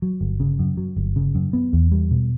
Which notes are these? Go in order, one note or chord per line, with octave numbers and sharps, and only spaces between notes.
F#3
G1
C#3
F#2
F#3
G1
C#3
F#2
B3
E2
G3
B2